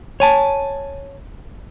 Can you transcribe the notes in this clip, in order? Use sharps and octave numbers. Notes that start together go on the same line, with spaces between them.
C#5 G#5 A5